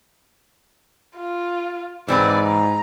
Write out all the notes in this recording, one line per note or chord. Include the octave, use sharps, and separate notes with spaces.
F4
G#2 E3 C4 B4 D5
A#5